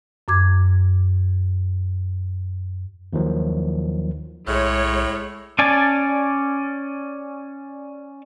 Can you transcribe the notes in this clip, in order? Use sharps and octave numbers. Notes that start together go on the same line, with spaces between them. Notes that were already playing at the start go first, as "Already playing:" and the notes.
F#2 D6 G#6
D#2 D#3 F3 F#3
B1 A2 G#3 C#5
C#4 D5 G#5 A5